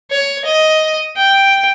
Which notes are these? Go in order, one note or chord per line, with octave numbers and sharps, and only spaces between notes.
C#5
D#5
G5